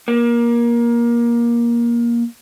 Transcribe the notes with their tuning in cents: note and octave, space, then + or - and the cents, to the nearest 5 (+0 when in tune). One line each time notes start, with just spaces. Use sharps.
A#3 +20